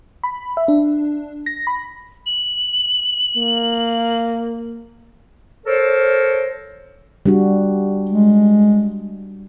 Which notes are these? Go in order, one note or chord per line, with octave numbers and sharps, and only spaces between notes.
B5
E5
D4
A#6
B5
F#7
A#3
A4 A#4 C5 C#5
G3 D4 F#4
G#3